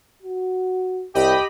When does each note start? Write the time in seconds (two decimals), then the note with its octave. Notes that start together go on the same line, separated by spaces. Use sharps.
0.23 F#4
1.15 C2 G4 D#5 G5 B5